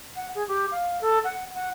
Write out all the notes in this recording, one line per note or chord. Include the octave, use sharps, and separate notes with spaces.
F#5
G#4
G4
F5
A4
F#5
F#5